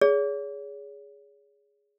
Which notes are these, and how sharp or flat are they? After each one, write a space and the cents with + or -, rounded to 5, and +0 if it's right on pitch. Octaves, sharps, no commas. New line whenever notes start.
G#4 +0 C#5 +40